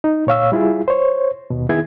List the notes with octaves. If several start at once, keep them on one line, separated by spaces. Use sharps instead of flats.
D#4
A#2 C#5 F5 E6
G3 E4 F4 G#4
C5 C#5
D#2 B2
D#3 B3 E4 G#4 G#6